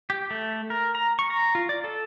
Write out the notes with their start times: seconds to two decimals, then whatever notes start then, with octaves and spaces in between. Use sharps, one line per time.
0.10 G4
0.31 A3
0.70 A#4
0.95 A#5
1.19 C#6
1.30 A#5
1.55 F4
1.69 D5
1.84 A4